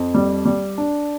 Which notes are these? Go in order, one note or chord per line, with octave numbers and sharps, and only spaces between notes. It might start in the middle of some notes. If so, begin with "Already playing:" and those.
Already playing: F2
G3
G3
D4